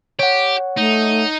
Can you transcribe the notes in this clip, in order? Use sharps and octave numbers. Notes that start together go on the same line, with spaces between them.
G4 C#5 F#5
A3 D#4